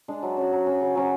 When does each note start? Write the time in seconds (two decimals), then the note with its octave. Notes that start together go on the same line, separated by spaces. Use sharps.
0.08 G#3 D4
0.22 F#3
0.37 C#4 F#4
0.53 F#3
0.67 C#4 F#4
0.81 C#3
0.95 F#3 C#4 F#4